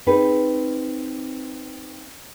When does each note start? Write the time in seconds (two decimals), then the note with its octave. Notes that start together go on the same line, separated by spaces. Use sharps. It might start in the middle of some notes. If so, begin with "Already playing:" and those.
0.07 C4 D#4 G#4 B4